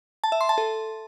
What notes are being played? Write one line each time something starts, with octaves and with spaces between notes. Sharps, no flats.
A5
E5
C6
A5
A4